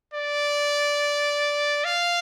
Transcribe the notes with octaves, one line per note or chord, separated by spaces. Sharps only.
D5
F5